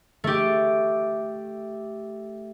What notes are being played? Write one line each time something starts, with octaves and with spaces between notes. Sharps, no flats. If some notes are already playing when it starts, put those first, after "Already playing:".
A3 G4